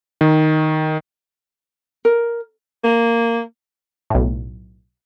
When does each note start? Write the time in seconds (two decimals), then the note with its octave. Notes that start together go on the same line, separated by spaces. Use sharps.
0.21 D#3
2.05 A#4
2.84 A#3
4.10 B1 A2